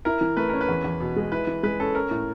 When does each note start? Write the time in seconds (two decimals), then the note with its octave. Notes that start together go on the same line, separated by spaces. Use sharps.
0.05 E4 A#4
0.21 E3
0.37 A3 B4
0.49 C#4 A#4
0.61 B4
0.69 E2
0.84 E2
1.00 B2
1.16 G#3
1.32 E4 B4
1.47 E3
1.63 G#3 B4
1.80 C#4 A4
1.94 C#4 A#4
2.11 A2